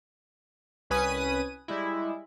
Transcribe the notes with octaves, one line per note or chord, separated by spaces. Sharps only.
C2 C#4 B4 G#5 D#6 D#7
G3 G#3 E4